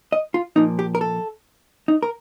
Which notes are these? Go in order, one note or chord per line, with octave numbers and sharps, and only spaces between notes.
D#5
F4
A#2 F3 A#3 D#4
G4
A#4
A4
D#4
A#4